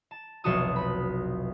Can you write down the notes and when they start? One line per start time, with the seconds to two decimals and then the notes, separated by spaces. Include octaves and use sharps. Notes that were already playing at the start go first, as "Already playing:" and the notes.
0.11 A5
0.44 F1 B1 F3 F#4 A5 D#6
0.76 B4 B5